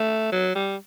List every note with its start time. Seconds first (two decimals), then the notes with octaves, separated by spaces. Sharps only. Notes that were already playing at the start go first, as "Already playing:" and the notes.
Already playing: A3
0.32 F#3
0.55 G3